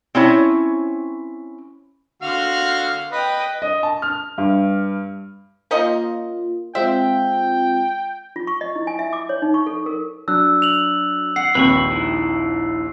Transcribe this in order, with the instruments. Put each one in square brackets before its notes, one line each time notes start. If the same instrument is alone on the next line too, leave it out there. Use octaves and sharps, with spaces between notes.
[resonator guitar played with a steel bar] C4 C#4 E4 C#5
[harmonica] D3 F#4 F6 [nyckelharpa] F5 C6
[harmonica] B4 [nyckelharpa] D#5 G5
[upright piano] D#5
A5
F6
G2
[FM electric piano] A#3 F4 [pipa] C#4 D#4 D#5
[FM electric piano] G#3 C4 F4 [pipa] E5 [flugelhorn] G5
[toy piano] F4
C#6
D#5
E4
G#5
E5
D6
C#5
D#4
C#6
A4
A#4
[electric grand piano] F#3 D4 [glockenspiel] E6 F#6
[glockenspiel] F7 F#7
[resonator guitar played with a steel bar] F#5 [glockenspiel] C7
[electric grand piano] A#1 D#2 [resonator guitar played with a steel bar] C4 [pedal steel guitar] B4 B5 C#6
[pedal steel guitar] D#4 E4